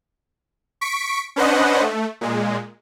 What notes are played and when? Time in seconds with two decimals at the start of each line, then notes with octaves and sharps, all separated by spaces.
0.81 C#6 B6 D7
1.36 C#4 D4 B4 C5 D#5 F#5
1.81 A3
2.21 A#2 G#3